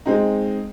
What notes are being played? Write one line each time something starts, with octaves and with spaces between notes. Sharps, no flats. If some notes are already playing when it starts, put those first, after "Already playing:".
G#3 C4 D#4